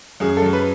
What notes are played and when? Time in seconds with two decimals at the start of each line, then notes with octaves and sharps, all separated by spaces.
0.20 F#2 G#4
0.37 A4
0.42 F#2
0.53 B4